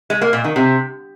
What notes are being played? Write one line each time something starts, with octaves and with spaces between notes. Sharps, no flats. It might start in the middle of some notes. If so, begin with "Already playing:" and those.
G#3
A#3
A#2
D#3
C3